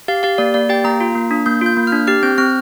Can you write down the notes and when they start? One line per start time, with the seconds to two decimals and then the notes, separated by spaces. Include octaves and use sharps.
0.08 G4 F5
0.23 G4 F5
0.38 A#3 D5
0.54 A#3 D5
0.69 G4 G5
0.85 A#3 A#5
1.01 F4
1.15 A#3
1.31 D4
1.46 A#3 G6
1.61 F4 G6
1.77 A#3
1.87 F6
1.92 D4
2.07 G4 F6
2.23 C4 G6
2.38 C4 F6